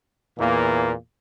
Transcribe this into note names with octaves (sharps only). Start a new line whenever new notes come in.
E2 A#2 E3 A#3